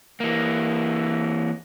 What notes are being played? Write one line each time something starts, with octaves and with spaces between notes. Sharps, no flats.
E3 A#3